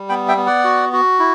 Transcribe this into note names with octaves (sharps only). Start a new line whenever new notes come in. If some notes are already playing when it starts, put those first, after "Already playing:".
Already playing: G3
B3 G5 B5
E5 G5
B3
D5 F#5
F#4
F#4
E4